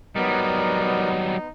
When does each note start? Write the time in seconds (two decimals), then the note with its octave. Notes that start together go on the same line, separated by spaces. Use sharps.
0.15 F#3 G3 B3 D#4 A#4 D5